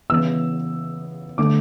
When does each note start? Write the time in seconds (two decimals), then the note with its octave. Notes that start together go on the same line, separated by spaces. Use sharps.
0.10 C#3 E3 B3 E6
1.38 D3 A3 D6